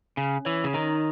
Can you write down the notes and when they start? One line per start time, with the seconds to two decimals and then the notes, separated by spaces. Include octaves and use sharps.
0.17 C#3 C#4
0.45 E3 C#5
0.64 C#3
0.74 D#3 D#4